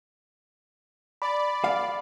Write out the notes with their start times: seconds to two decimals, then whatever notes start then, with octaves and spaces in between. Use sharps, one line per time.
1.22 D5 B5
1.64 F5